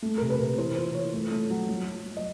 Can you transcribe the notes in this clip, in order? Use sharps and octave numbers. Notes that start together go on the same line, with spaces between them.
A3
C3 A#4
B4
C3
E3 C5
F4 C5
E3 C#5
A3
A3
F#3
F#3
F#3
F#3
D#5